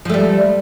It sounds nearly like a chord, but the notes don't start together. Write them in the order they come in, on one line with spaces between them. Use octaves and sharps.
F3 A3 G3